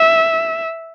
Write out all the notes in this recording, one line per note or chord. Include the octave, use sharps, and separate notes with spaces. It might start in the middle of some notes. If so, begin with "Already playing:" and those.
Already playing: E5